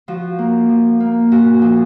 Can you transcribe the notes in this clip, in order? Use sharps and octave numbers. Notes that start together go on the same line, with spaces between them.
F3 F#4
A#3
F3
A#3
A#2 F#4
F3